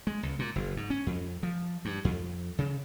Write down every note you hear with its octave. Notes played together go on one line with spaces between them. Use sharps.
G#3
C#2
A#2
F#1
G#2
C#4
F2
F3
G2
F2
C#3